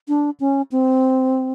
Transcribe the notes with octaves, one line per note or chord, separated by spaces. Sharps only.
D4
C#4
C4